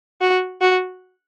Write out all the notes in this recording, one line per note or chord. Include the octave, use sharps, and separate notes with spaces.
F#4
F#4